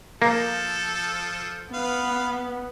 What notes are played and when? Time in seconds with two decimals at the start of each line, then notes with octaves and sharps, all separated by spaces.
0.22 F3 A#3 A4
1.74 B3 B4 F5